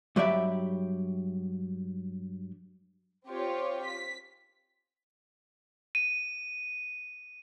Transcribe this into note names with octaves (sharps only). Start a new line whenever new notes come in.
G2 F#3 G4 D5 E5 B5
C4 F4 G4 C#5
B6
D#7